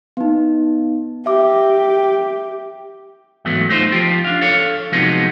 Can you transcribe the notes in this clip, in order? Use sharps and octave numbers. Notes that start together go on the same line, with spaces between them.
B3 D#4
G4 E5 D6
E2 G#2 F#3 A3 B3
A3 D#4 F4 C5
F3 F4 G4
D4 F5
A4 C#5 F5
C3 F3 F#3 G#3 B3 D#4